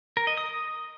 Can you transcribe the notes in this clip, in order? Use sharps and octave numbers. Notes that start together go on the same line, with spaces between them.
A#4
D#5
D#6